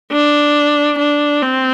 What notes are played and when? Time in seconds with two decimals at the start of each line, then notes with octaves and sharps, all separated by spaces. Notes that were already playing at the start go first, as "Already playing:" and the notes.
0.12 D4
0.98 D4
1.41 C4